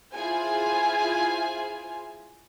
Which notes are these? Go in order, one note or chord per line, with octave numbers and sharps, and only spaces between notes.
E4 F4 G#4 C5 G#5